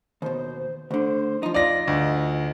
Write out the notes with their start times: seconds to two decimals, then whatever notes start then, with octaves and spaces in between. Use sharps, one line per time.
0.22 D#2 B2 C5
0.91 D2 D3 C5
1.43 F3 D#4
1.54 D#4 F4 D5 D#5 A#6
1.88 D2